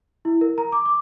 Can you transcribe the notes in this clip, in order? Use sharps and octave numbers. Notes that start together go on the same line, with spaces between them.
E4
A#4
A#5
D6
D6